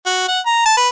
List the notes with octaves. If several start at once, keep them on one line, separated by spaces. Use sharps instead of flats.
F#4
F#5
A#5
A5
B4